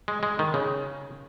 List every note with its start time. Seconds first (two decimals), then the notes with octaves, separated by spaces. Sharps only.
0.08 G#3
0.23 G#3
0.39 D#3
0.54 C#3